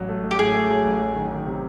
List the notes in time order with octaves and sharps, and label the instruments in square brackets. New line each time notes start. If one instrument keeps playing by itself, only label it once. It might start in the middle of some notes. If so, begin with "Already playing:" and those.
Already playing: [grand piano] A1 F#3
A3
A3
[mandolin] G4
[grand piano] A2 [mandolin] G#4
[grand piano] A3
F#3
A1
F#3
D#3
D#3
C3